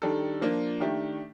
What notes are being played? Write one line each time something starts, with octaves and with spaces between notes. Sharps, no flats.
D#3 G3 D4 A4
F3 A#3 D4 F4
D#3 A3 D4 G4